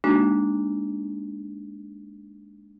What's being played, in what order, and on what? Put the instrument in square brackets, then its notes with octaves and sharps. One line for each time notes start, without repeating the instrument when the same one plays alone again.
[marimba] G#3 A#3 D4 D#4 F#4